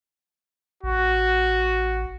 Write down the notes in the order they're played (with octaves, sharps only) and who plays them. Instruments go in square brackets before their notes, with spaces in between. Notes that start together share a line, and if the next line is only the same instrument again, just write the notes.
[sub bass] A1 [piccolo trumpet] F#4